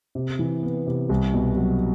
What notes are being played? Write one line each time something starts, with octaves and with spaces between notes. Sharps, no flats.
C3
E3
B3
C3
C2
B2
F#3